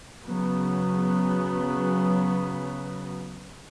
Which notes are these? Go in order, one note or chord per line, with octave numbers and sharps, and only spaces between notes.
C#3 F#3 B3